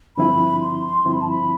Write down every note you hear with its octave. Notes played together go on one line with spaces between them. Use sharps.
G2 D3 F3 C4 E4 B5
C6
G2 D3 F3 C4 E4 C6
B5
A5
B5